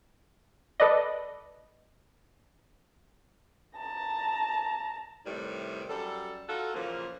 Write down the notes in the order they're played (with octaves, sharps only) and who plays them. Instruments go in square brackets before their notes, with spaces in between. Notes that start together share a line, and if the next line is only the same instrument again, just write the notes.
[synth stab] A4 B4 D5 D#5
[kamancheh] A5 A#5
[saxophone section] A2 C3 D#3 G3 B4
F#2 G3 A4
D#4 F4 F#4 A4
A#2 C#3 E3 F3 A#3